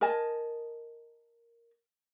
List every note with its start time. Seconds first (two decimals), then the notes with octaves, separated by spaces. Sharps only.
0.01 A#4 D#5 G#5 A5